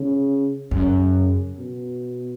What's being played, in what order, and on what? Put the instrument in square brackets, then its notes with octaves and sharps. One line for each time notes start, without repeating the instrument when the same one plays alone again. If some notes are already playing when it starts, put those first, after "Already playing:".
Already playing: [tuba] C#3
[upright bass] F#2 [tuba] C#3
[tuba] B2